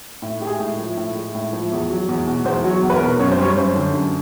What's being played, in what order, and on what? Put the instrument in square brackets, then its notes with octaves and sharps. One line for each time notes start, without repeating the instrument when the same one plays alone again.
[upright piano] A2
G#3 G4
G#4
A2
F3
A2
G#3
A2
F3
E2
F#3
E2
B2
E2 C5
F#3
C#5
E2
B4
A#4
B2
F#2 C#5
C5
G3 C#5
F#2 C5
D3
F#2